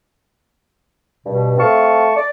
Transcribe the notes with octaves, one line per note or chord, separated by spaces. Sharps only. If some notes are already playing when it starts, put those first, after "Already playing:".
G2 B2
A3 C4 F5 A5 C#6
D5